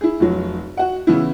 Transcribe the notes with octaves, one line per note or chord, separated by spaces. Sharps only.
E4 G#4
F1 F#3
F#4 F#5
C#3 E3 B3 E4